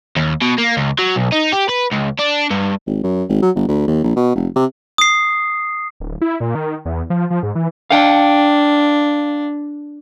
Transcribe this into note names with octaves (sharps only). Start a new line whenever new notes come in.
D#2
B2
A#3
C#2
F#3
B1
D#4
G4
B4
C#2
D4
G2
G#1
F#2
G#1
F#3
G1
D2
D#2
A#1
B2
F1
C3
D#6 C7
D1
E4
A#2
D#3
E2
F3
F3
G#2
E3
D4 F5 G5